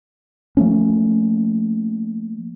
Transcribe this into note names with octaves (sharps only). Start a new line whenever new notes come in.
F3 A3 A#3 C#4